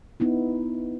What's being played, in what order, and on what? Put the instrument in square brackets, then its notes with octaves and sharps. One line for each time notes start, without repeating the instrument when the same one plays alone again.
[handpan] B3 D#4 E4